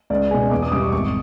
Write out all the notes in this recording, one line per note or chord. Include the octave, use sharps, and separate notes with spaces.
C#2 D5
B2 G#3 G#5
E2 D6
D#6
B2 G3 D6
C#6
G#1 C#6